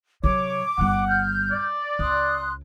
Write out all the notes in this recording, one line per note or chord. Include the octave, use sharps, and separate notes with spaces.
C3 F#3 C#5 D6
G1 G2 F#5
F6 G6
D5
C#2 C6 D#6 F#6